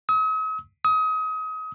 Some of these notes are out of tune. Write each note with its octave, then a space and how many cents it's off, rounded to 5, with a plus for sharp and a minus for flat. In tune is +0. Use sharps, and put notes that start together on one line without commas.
D#6 +45
D#6 +30